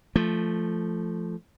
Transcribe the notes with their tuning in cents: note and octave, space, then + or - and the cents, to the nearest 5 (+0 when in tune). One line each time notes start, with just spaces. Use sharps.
F3 -10 A3 +0